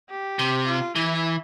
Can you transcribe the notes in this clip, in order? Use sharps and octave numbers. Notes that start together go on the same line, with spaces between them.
G4
C3
F4
E3 E4